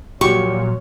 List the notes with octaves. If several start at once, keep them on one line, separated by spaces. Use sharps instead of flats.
A#2 F3 F#3 F#4 G4 C#5 C#6